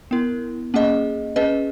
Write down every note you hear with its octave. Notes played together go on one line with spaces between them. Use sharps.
B3 E4 A#4
A#3 C#4 G#4 D#5
C#4 G#4 B4 D#5